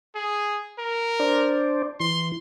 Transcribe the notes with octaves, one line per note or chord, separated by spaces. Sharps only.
G#4
A#4
D4 C5 D5
E3 C6